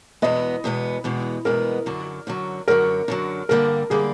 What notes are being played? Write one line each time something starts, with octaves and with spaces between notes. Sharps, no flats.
E2 B2 G#3 B3 D#5
E2 B2 G#3 B3
E2 B2 G#3 B3
E2 B2 G#3 B3 A#4
F#2 D3 F#3
F#2 D3 F#3
F#2 D3 F#3 A#4
F#2 D3 F#3
G2 D3 G3 A#3 A#4
D3 G3 A#3 G#4